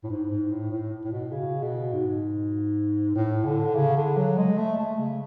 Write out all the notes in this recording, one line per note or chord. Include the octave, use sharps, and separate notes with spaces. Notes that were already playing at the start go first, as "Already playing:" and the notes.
A2
G#2
G#2
A2
A2
A2
B2
C#3
B2
G#2
A2
D3
C#3
D3
F#3
G#3
A3
A3
C#3